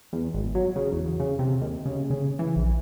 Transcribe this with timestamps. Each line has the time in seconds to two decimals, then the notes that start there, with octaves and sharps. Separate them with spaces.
0.13 E2
0.34 G#1
0.55 F#3
0.76 C#3
0.92 E2
1.20 C#3
1.39 C3
1.61 D#2
1.85 C#3
2.10 C#3
2.39 E3
2.56 A#1